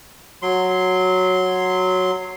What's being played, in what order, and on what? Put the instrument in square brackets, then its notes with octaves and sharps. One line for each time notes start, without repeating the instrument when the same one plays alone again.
[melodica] F#3 C6